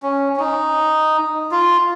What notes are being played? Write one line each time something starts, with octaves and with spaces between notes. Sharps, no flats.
C#4
C#4
D#4
F4